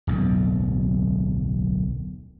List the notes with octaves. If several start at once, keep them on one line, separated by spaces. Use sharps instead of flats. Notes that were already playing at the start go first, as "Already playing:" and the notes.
D1 B1 F2